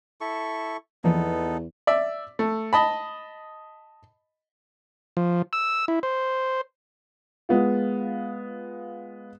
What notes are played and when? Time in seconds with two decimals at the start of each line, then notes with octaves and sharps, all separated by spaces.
0.21 E4 A4 C#6
1.04 E2 E3 F3 A#3 B3 D#4 A4
1.87 D5 E5
2.39 A3
2.73 D#5 A5 B5
5.17 F3
5.53 E6
5.88 E4
6.03 C5
7.49 G#3 B3 F4